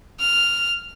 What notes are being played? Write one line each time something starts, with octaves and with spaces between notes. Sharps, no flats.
F6